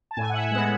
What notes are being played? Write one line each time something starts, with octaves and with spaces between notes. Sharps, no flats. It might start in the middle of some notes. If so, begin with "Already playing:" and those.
A5
A2 G#5
F#5
E5
E5
G#3 B3 F#5